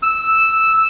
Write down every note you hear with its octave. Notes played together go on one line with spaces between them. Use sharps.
E6